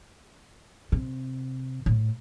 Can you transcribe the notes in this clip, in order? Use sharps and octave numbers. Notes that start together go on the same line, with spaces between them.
C3
A2